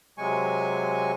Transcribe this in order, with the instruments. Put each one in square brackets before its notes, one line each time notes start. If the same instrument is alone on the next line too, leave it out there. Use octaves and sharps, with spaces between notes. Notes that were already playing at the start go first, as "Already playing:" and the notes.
[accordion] C3 F#3 G#3 G#5 C#6